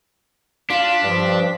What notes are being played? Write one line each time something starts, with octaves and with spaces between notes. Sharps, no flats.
D4 F4 B6
G2 F3